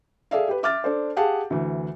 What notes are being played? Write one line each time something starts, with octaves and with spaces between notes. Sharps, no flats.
G#4 A4 D5 E5 F5
G4 B4
E5 D6 F6 A6
D4 A4 C5
G4 G#4 F5 F#5 A5
D2 E3